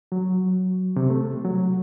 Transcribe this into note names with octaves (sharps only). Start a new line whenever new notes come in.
F#3
C3
A3
F#3